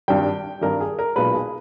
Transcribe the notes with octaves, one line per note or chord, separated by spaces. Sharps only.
G#1 G2 G3 G5
G#1 G2 G3 A#4
G#4
A#4
B1 A#2 G#3 B4
G#4